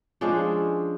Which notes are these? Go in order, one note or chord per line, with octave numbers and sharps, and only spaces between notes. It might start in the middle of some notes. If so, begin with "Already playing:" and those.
F3 G#3 C#4 D4